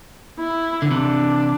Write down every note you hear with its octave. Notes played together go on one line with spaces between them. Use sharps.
E4
D3
C3 E3 D4